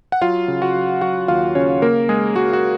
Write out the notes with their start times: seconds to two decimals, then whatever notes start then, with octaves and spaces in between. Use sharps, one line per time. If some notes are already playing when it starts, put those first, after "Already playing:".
0.12 F#5
0.22 F#3 F4 F5
0.48 C#3
0.62 F#4 F#5
0.75 F#3
1.01 F#3 F#4 F#5
1.28 D#2 F4 F5
1.55 C#3 C#4 C#5
1.82 C#3 A#3 A#4
2.09 G#3 G#4
2.36 G#3 F#4
2.53 F#4